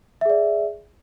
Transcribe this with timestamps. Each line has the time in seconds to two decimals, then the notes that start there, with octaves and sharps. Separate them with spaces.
0.21 E5
0.25 G#4
0.30 D5